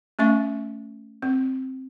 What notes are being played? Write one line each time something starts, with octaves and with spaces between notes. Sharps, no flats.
A3 C#4 E5 C#6
C4